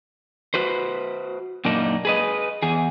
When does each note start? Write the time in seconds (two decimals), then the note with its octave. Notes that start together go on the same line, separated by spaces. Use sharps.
0.54 F#4 B4 C5
1.65 F#2 A#2 A#3 D4 D#4
2.05 G#4 B4 D#5
2.62 E2 G#4